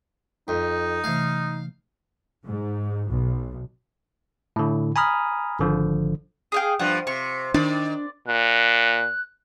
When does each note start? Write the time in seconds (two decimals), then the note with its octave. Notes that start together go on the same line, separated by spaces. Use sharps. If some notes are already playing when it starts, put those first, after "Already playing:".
0.48 F2 D#4
1.04 C3 E3 A3 F5
2.46 G#2
3.09 B1
4.56 A2 D3
4.96 G#5 A#5 B5 D#6 F6
5.59 G#1 D3 F3
6.52 G#4 F5 G5
6.79 G2 F3 F#5
7.07 C3 C#6
7.54 D#3 D4 D5
8.27 A#2 F#6